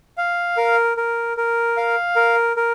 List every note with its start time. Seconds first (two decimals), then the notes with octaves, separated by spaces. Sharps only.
0.18 F5
0.57 A#4
0.97 A#4
1.37 A#4
1.77 F5
2.16 A#4
2.57 A#4